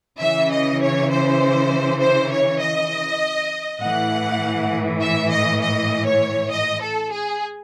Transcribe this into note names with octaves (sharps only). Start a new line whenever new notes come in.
C#3 E3 E5
D#5
C#5
C5
C5
C#5
D#5
A2 E3 F#5
E5
D#5
D#5
C#5
D#5
A4
G#4